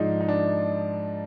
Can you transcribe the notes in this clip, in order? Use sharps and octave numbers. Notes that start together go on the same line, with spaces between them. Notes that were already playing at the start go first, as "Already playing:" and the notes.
Already playing: G#2 F3 G#3 D4 D#4
D#4
D4